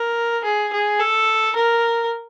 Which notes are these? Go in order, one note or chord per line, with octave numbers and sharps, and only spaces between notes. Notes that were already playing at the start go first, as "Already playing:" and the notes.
Already playing: A#4
G#4
G#4
A4
A#4